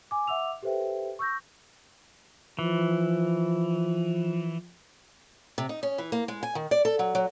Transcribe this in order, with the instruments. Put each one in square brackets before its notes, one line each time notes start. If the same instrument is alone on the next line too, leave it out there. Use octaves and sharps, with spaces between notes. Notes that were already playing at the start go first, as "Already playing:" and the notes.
[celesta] G#5 D6
E5 F#5 D6 E6 F7
G4 A4 B4 C5 E5 G5
C#6 E6 G6 A#6
[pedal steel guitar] E3 [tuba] F3
[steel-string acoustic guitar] C3
D#4
C#4
E3
A#3
G#3
G#5
D#3
D5
A4
F#3
F#3